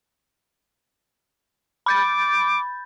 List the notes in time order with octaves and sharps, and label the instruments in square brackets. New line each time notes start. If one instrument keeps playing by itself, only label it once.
[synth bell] B5 G6 A6 [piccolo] D6